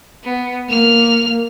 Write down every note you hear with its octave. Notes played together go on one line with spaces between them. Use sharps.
B3
A#3 F6 F7